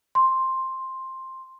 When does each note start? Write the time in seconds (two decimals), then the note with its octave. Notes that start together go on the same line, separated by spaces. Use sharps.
0.15 C6